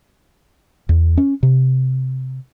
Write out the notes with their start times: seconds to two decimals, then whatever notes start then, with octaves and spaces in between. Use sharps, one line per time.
0.89 E2
1.17 C#4
1.43 C3